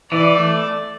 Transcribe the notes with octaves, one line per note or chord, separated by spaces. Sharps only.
E3 D5
A3